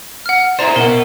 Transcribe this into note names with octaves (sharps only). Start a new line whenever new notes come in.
F#5 F6
E4 G#4 C5 D5 A#5
B2 A#4 F#5